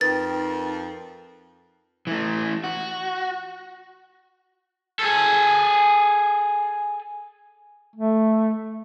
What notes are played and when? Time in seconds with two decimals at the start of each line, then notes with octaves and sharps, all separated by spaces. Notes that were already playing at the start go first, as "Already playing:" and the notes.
0.01 F2 D#4 A#4 B4 G5 A6
2.07 E3 A3
2.64 F#4
4.99 G#4 A4
7.96 A3